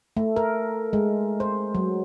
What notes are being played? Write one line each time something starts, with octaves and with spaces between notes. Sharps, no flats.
A3
A#4
G#3
C5
F#3